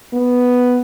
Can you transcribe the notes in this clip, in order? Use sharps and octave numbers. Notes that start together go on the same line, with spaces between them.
B3